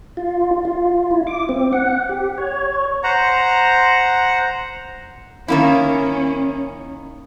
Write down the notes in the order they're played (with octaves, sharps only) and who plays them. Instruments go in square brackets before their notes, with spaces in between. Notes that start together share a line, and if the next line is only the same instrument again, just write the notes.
[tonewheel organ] F4
F4
E4
D6
C4
F#5
G4
C#5
[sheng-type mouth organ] C5 F#5 A#5
[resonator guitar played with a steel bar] D#3 A#3 E4 [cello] C#4